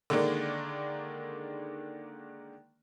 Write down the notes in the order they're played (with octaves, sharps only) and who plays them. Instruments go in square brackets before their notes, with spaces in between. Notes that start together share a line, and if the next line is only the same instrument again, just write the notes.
[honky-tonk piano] D3 D#3 G#3 A#3 D4